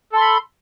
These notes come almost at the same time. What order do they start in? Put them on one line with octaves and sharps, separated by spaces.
A4 C6 B5